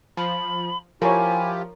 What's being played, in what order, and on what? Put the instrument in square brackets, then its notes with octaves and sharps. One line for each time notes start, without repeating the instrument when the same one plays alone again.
[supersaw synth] F3 [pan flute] B5
[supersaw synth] F3 [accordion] E4 F4 G4 [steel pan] A#4 C#5 [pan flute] G#5